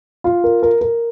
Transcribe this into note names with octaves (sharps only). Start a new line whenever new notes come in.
F4
A#4
A#4
A#4